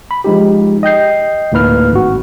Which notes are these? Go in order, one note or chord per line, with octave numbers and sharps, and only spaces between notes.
B5
F3 G#3 D#4 G4
D#5 G5 G6 C7
D2 A2 A#3 D#4 B4 F6
G#1 F#4